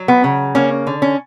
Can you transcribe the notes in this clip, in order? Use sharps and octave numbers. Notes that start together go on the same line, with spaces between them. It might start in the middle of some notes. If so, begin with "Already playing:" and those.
Already playing: F#3
B3
C#3
A#3 C#4
D3
C#4